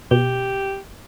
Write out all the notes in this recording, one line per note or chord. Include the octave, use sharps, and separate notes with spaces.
B2 G4